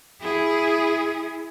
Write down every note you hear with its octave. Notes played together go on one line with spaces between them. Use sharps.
E4 G#4